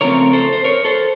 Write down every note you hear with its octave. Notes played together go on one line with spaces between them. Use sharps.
C#3 F3 A3 C4 A#4 C#5
A4 C5
C5
A#4 C#5
A4 C5